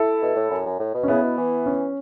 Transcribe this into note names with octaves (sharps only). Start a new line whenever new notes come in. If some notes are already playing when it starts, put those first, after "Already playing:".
Already playing: E4 A4
B2
A2
F#2
F#2
A2
B2
C#4
C#3 B3 E4
B2
E3
C#4